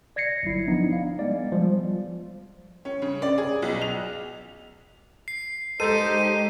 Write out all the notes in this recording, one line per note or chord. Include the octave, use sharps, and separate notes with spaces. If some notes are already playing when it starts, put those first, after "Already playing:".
D5 G#6 A#6 C7 C#7
G1 F#3 E4
F3 B3 D4 D#4
F5
G#3 B3 D5
F3 G3
C#4
C#3
D5
G#4
B1
F7
C7
G#3 D#4 G4 A4 C5 D#7